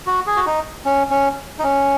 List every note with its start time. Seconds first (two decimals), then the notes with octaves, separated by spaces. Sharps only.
0.06 F#4
0.27 G#4
0.36 F#4
0.46 D#4
0.85 C#4
1.10 C#4
1.59 D#4
1.63 C#4